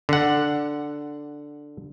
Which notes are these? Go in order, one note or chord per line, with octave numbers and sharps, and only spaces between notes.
D3 F#5